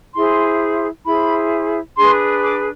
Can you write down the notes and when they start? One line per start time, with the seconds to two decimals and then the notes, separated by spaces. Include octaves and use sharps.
0.14 E4 G#4 C5 C6
1.05 E4 G#4 C5 B5
1.96 D4 G#4 B4 C6
2.41 D6